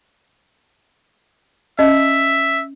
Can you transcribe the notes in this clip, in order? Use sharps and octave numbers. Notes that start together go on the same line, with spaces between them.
C#4 D#5 E5